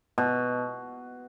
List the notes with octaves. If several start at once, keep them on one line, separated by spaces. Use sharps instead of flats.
B2